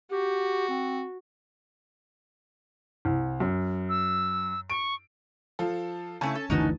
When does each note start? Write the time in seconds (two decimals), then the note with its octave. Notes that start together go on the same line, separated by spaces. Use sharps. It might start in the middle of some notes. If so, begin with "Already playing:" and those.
0.11 F#4 G4
0.69 C4
3.05 C2
3.40 F#2
3.89 E6
4.70 C#6 D7
5.59 F3 F4 A4
6.21 C#3 A3 C#4 E4 G#5 A5
6.35 A4
6.50 F#1 D2 D#3 E3 D#4 F#4